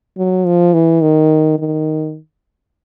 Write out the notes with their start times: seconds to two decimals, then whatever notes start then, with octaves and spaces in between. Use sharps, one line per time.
0.17 F#3
0.46 F3
0.74 E3
1.02 D#3
1.59 D#3